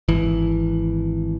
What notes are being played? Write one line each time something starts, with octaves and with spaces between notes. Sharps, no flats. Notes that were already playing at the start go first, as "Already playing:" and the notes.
G#1 E3